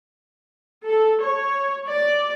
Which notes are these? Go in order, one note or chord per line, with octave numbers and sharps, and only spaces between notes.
A4
C#5
D5